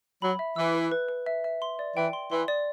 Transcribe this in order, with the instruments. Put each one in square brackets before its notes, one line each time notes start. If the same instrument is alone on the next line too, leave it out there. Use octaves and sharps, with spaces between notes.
[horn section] F#3 [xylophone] B5
[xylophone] E5
[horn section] E3 [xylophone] E6
[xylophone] B4
B4
B4
E5
E5
C6
D5
[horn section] E3 [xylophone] G5
[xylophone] C6
[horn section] E3 [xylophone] C6
[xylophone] D5